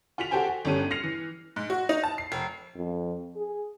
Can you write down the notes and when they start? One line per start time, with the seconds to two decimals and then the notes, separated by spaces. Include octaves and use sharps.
0.18 F4 F#4 F#5 B6 F7
0.31 F#4 G4 A4 C5 G5 G#5
0.46 F#4
0.65 G1 G3 C#4 A4 D#7
0.91 F6 A#6 C7 C#7 F7
1.04 E3
1.56 G#2
1.70 F#4
1.89 D#4
2.04 A5
2.18 C7
2.32 F1
2.76 F2
3.36 G#4